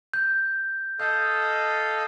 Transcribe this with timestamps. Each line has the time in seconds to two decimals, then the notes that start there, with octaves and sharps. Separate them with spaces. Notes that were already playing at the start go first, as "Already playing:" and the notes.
0.14 G6
1.00 A4 D#5 F5 G6